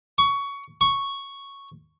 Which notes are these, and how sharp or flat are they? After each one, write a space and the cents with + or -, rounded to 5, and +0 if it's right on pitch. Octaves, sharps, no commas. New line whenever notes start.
C#6 +20
C#6 +0